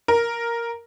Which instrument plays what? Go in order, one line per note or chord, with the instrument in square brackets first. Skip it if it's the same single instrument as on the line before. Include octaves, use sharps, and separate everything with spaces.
[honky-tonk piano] A#4